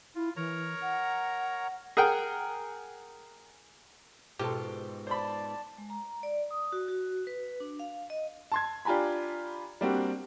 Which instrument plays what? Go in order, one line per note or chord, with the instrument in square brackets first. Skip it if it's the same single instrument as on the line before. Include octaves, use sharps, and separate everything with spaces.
[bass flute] E4 [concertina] F4
[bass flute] E3 [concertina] A#4 C#5 A#5
[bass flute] F#5
[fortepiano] G#4 A#4 F#5 G5
[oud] G#2 B2 F4 [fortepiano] G4 A4
[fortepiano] C5 B5 [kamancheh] D5 A5
[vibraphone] G#3
A#5
D5
D#6
F#4
F#4
B4
D4
F5
D#5
[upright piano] A5 C6 G#6
D4 F4 G4 G#5 A#5 B5
G3 A#3 C4 D4 F#4